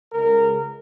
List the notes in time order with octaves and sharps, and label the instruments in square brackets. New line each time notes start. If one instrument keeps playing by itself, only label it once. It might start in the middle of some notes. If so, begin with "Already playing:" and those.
[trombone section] C#2 C#3 G#3 A#4